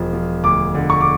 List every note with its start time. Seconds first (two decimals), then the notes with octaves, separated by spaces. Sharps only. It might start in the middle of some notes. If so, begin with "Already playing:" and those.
Already playing: E1 F3
0.13 F3
0.44 D2 D6
0.74 D3
0.90 C#6
1.01 D6